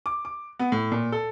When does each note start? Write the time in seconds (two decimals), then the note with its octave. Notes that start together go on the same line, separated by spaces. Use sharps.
0.06 D6
0.25 D6
0.59 B3
0.72 A2
0.92 A#2
1.12 A4